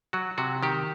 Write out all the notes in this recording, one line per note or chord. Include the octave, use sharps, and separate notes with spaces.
F#3 F#4
C3 F#4
D#3 G4